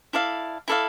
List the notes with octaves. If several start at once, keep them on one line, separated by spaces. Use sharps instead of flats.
E4 A4 D5 F5
E4 A4 D5 F5